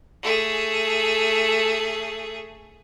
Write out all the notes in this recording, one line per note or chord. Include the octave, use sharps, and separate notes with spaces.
A3 G#4